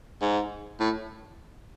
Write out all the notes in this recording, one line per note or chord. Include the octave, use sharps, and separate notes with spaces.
G#2
A2